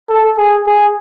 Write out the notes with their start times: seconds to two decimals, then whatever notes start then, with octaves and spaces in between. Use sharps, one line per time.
0.09 A4
0.37 G#4
0.66 G#4